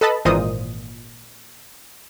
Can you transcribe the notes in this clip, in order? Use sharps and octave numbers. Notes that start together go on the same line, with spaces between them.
A4 B4 D#5 A5 B5
G#1 A#2 E3 C5 D#5 D#6